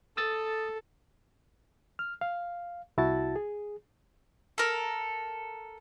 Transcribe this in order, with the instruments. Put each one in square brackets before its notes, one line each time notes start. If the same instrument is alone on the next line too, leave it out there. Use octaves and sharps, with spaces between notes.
[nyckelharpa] A4 [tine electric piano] D#6 E6 A6
[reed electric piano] F6
F5
C2 E4 F#4 A5 A6
G#4
[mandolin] A4 A#4